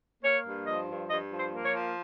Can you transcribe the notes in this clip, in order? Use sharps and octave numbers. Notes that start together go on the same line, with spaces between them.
A#3 C#5
G2
F3 D#5
G2
G2 D#5
F3
C5
A#3
C#5
F3